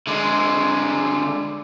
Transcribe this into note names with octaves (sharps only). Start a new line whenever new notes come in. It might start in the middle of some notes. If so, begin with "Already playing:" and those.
D3 G#3